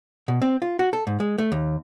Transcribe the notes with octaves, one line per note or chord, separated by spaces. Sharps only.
B2
C4
F4
F#4
A4
G#2
G#3
A3
D#2